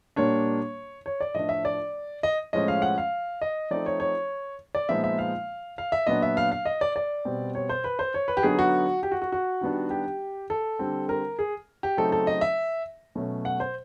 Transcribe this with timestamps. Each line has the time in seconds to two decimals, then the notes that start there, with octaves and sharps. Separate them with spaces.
0.16 A#2 G3 A#3 D4 C#5
1.06 C#5
1.21 D5
1.34 A2 F3 A3 D4 D#5
1.49 E5
1.65 D5
2.23 D#5
2.53 A2 F3 G#3 C#4 D#5
2.68 F5
2.82 F#5
2.98 F5
3.42 D#5
3.71 F3 A3 C4 D#4 D5
3.86 C#5
4.00 C#5
4.75 D5
4.89 A#2 F3 G#3 B3 D#4 E5
5.04 E5
5.19 F5
5.78 F5
5.92 E5
6.07 A#2 F#3 B3 D4 D#5
6.22 E5
6.37 F5
6.52 F5
6.66 D#5
6.81 D5
6.96 D5
7.25 B2 G3 C4
7.55 C#5
7.69 C5
7.84 B4
7.99 C5
8.14 C#5
8.28 B4
8.37 G4
8.43 D3 F#3 B3 D#4 G#4
8.59 F#4
9.03 G4
9.12 F#4
9.22 F#4
9.32 F#4
9.61 D#3 G3 B3 D4
9.90 G4
10.50 A4
10.79 D3 G3 C4
11.09 A#4
11.39 G#4
11.83 G4
11.97 C#3 F#3 A3 C4 D#4 A4
12.12 A4
12.27 D#5
12.41 E5
13.15 B2 F#3 A3 C#4
13.45 F#5
13.60 C5